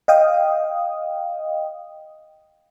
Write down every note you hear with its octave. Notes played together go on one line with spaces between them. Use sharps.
D#5 F5 G5 D#6